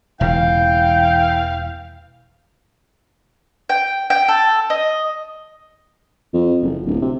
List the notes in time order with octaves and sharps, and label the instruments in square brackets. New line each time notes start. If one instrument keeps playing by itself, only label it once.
[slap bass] E1 A#2 C#3 [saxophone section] E3 F5 [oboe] G5
[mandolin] G5
G5
A4
D#5
[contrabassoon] F2
F#1
D1
C3